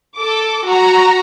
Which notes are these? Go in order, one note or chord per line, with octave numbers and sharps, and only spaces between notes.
A4 D6
F#4 A#5